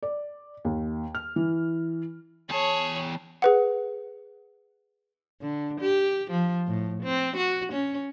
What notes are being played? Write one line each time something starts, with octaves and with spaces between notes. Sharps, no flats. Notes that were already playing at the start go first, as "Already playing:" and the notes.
D5
D#2
F6
E3
E2 G#4 C#5 A5
G#4 B4 F#5
D3
G4
F3
A2
C4
F#4
C#4